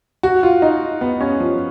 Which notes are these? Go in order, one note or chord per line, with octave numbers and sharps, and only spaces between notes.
F#4
F4
D#4
B3
C#4
F3